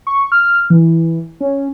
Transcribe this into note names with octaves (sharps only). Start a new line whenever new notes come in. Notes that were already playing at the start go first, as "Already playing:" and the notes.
C#6
F6
E3
C#4